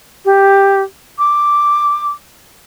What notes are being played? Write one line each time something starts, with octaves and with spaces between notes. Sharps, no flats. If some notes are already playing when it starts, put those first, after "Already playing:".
G4
D6